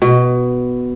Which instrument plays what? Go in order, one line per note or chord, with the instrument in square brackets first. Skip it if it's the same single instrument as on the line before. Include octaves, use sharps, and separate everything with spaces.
[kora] B2